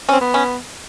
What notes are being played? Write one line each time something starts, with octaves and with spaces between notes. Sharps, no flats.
C#4
C4
B3
C#4